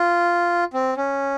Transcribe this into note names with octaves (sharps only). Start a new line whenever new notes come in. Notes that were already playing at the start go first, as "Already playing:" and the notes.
Already playing: F4
C4
C#4